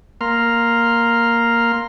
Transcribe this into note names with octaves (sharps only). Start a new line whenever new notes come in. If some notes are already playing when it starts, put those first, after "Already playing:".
A#3 A#5 C6 F6